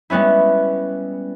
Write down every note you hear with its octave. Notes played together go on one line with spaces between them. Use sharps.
G3 G#3 B3 C#4 E4